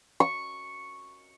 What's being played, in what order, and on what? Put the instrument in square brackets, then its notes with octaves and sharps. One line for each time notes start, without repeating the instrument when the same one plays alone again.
[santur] C#6